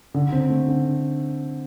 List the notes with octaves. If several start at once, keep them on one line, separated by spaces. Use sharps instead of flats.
D3
C4
A3
D3